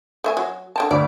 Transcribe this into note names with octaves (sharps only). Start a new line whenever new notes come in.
A3 E5 G#5
F#3
D3 G5 A5
D2 D5